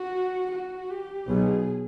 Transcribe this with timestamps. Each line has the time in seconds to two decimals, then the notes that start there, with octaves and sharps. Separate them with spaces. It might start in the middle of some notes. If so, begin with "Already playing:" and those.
Already playing: F#4
0.51 F#4
0.90 G4
1.28 B1 B2 G#4